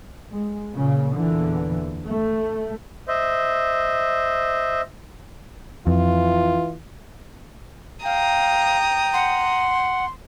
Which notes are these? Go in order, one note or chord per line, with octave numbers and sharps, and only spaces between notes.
G#3
A#2 C#3
E2 A#2 D3 E3
A3
C5 D#5 E5
F2 E3 F4
F5 G5 A#5 D#6
F#5 C6